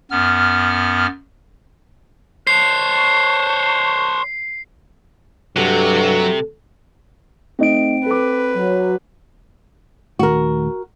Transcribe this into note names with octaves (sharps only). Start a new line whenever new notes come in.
F#2 B3 F6
C5 C#5 A5 C#6 F#6 C7
G2 C3 F#3 A3 A4
A3 C4 D#4 D#5 D7
A4 B4 D6
F#3
D#1 D#3 A3 F#4 A#4